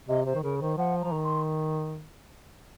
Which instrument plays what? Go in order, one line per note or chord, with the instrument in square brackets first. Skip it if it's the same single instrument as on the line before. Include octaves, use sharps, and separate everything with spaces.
[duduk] C3 [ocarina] D#5
[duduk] C3 [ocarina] C5
[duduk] D#3
[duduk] C#3 [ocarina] A#4
[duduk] D#3 [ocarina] C5
[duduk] F3 [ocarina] F#5
[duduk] F3 [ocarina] A#5
[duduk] D#3
[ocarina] C6